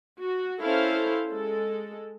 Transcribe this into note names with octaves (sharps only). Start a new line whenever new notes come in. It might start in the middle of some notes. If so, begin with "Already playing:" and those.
F#4
C#4 E4 A4 C5 F5
G#3 A4